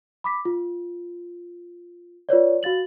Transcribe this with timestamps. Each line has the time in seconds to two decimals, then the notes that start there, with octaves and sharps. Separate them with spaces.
0.24 B5 D6 B6
0.45 F4
2.29 F4 B4 C#5 D5
2.63 F#4 F5 A6 F#7